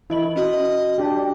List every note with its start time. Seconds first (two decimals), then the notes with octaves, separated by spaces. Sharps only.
0.10 E3 E4 D#5 F#7
0.36 C#4 F#4 D#5
0.98 D4 G4